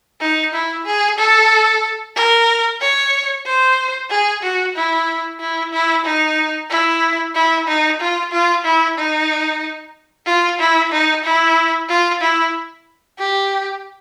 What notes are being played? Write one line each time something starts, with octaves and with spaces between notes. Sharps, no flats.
D#4
E4
G#4
A4
A#4
C#5
C5
G#4
F#4
E4
E4
E4
D#4
E4
E4
D#4
F4
F4
E4
D#4
F4
E4
D#4
E4
F4
E4
G4